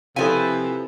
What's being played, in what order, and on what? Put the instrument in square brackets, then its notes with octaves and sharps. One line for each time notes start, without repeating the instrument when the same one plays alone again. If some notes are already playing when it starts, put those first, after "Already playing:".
[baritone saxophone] C3 [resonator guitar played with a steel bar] F3 G#5 [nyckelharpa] E4 B4 [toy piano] A4 F5